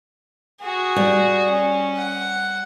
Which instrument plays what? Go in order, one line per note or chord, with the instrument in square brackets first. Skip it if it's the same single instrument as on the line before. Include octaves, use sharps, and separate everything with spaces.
[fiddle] F#4 G#4
[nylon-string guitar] G3
[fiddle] C#4
F#5